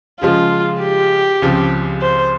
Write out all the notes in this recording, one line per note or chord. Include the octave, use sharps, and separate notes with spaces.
C#3 F3 G#3 F4
G4
C#2 C#3 F3 C4
C5